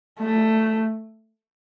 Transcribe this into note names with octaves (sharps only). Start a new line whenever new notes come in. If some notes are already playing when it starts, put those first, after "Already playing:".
A3